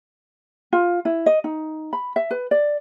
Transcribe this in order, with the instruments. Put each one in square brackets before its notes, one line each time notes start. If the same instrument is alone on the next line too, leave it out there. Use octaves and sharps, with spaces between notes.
[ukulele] F4
E4
D#5
D#4
B5
E5
B4
D5